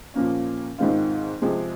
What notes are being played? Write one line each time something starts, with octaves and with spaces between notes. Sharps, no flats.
A#2 F3 A#3 C#4
G#2 D#3 G#3 C4 F4
C3 F3 G#3